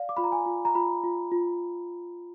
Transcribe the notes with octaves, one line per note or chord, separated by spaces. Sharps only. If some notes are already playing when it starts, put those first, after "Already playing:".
Already playing: D5 F5
D6
F4 B5
A#5
G#5
F4
A#5
F4 B5
F4
F4